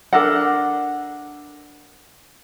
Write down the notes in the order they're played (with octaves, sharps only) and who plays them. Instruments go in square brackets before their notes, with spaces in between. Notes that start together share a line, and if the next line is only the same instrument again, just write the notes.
[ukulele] D4 A4 A#4 F#5